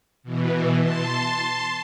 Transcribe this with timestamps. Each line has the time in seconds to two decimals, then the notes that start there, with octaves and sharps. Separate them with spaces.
0.23 B2 E3
0.80 A5 C6